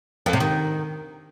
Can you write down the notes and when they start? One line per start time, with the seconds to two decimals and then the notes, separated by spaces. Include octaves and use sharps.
0.26 F2
0.33 C3
0.40 D#3